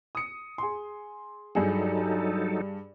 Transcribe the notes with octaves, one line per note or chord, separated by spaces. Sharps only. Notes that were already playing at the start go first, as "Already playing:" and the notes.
D#6 C#7
G#4 C6
G2 F#3 D#4 G#4 A4